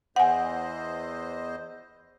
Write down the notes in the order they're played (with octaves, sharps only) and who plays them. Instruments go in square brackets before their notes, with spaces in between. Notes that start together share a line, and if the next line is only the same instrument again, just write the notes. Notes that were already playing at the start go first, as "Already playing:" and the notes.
[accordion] E2 C5 D#5 [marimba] F#5 G#5